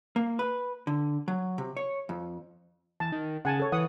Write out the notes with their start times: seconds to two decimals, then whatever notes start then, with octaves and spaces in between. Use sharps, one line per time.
0.16 A#3
0.39 B4
0.87 D3
1.28 F#3
1.58 C3
1.77 C#5
2.09 F2
3.00 E2 A5
3.12 D#3
3.45 C#3 F#5 G#5 A5
3.60 A4 C#5
3.72 E3 F#5 D#6